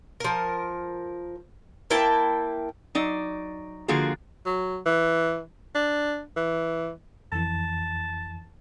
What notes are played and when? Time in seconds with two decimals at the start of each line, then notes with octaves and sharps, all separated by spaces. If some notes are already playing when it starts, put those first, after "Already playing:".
0.20 F3 A#4
1.90 A#3 E4 G5 A5
2.95 F#3 D#4 D5
3.88 D3 F3 A#3 F4 F#4 G#4
4.46 F#3
4.86 E3
5.75 D4
6.36 E3
7.32 F2 E3 A5